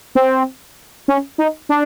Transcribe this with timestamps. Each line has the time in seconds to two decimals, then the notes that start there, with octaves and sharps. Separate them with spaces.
0.15 C4
1.08 C#4
1.38 D#4
1.69 D4